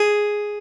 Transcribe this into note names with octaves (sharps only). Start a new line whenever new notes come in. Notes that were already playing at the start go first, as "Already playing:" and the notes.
Already playing: G#4